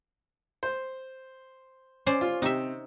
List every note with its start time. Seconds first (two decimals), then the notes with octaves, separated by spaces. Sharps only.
0.63 C5
2.06 C#4 C5 D5
2.21 F4
2.42 C3 D#4 E5